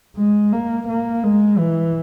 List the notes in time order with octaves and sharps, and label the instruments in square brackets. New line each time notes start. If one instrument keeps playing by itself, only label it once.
[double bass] G#3
A#3
A#3
G#3
E3